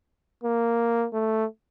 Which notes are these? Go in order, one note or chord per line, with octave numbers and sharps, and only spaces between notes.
A#3
A3